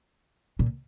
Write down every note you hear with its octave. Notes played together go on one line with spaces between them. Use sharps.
A#2